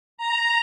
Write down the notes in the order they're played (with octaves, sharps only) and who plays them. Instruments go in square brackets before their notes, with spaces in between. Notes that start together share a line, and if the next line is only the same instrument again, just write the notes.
[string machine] A#5